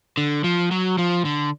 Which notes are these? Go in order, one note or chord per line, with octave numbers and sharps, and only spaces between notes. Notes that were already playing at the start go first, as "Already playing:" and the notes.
D3
F3
F#3
F3
D3